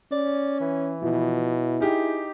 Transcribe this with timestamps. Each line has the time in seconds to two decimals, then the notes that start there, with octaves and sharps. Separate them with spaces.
0.11 C#4 D5
0.60 E3
1.02 B2 F3 E4
1.80 D#4 G4 G#4 G5